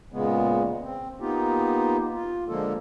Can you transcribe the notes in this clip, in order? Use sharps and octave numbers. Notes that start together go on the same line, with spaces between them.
A#2 C#3 G#3 B3
C4
A#3 B3 D#4 F4 G4
F4
D3 F3 G#3 A#3 A4